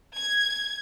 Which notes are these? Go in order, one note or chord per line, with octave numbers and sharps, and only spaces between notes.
G#6